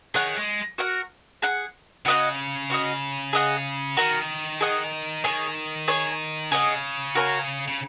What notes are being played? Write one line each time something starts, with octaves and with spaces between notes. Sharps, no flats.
D#3 G#4 C#5 F#5
G#3
F#4 A#4 F#5
G#4 F#5
C#3 F#4 D#5 F#5
C#4 F#4 D#5
G#4 D#5 F#5
D#3 F#4 A#4 F#5
G#4 D#5 F#5
D#3 G#4 C#5 G#5
G#4 C#5 G#5
C#3 G#4 D#5 F#5
F#4 A#4 C#5 G#5
C#3